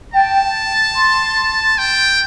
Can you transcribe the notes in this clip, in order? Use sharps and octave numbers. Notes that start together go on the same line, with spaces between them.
G5 A5
C6
G5